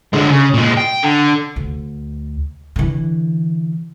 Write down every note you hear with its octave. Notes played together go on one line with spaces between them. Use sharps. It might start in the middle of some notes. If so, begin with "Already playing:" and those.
D3 G#3
C#3
A#2 G#3
G5
D3
D2
D3 E3